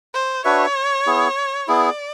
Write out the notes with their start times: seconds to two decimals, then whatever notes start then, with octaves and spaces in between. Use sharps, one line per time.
0.14 C5
0.45 D4 F#4 B4 C#5 E5
1.06 B3 E4 G#4
1.68 B3 E4 G#4 D5